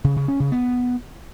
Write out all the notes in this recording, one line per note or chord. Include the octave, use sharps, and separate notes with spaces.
C#3
C#3
C#4
C#3
B3